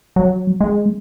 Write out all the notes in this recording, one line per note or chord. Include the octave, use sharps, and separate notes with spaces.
F#3
G#3